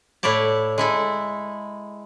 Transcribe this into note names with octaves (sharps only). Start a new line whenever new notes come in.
A2 E4 C#5 D5 A5
G#3 E4 A4